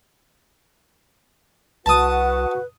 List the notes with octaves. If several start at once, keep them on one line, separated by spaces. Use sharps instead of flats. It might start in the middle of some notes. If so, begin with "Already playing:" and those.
C2 F#4 B4 F#5 A5 D#6